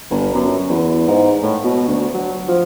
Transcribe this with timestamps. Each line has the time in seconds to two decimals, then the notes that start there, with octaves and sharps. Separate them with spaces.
0.10 G1
0.34 F#2
0.69 E2
1.07 G#2
1.43 A2
1.64 B2
1.88 D2
2.14 F#3
2.48 F3